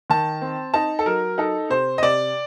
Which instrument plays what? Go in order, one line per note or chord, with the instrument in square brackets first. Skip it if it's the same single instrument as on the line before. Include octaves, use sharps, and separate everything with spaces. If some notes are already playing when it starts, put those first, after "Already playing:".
[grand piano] D#3 A5
C4
D#4 A5
A4
F#3 A#4
D#4 A4
C3 C5
D#5
C3 D5